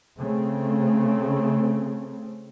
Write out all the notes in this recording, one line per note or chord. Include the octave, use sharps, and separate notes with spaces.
C#3 A3 C4